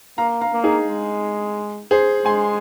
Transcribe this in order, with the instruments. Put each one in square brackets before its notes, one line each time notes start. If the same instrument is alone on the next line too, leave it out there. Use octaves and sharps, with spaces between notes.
[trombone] A#3 [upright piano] F5 A#5
[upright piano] F5 A#5
[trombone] A#3
[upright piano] D#4 G#4
[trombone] G#3
[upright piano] G#4 C5
[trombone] G#3 [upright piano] G#5 C6